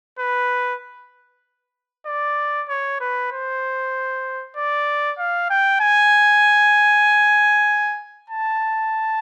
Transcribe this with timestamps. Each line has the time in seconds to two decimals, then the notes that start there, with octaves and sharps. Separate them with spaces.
0.19 B4
2.07 D5
2.69 C#5
3.01 B4
3.32 C5
4.57 D5
5.19 F5
5.50 G5
5.81 G#5
8.30 A5